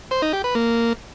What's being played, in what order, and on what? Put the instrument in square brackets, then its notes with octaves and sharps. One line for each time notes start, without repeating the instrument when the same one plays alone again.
[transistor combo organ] C5
D#4
G4
B4
A#3